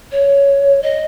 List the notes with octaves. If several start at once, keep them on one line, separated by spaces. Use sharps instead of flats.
C#5
D#5